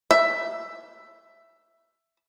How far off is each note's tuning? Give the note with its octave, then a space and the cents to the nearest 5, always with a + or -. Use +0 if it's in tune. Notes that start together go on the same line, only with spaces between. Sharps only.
E5 +10